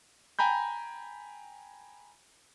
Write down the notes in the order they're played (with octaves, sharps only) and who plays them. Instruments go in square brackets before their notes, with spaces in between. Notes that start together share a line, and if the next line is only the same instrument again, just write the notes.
[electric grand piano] G5 G#5 A#5 B5 G6